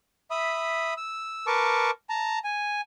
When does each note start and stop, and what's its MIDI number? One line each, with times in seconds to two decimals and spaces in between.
0.31 0.94 76
0.31 0.94 83
0.31 0.94 87
0.97 1.46 88
1.47 1.91 70
1.47 1.91 71
1.47 1.91 81
1.47 1.91 85
1.47 1.91 86
2.09 2.39 81
2.09 2.39 82
2.44 2.81 80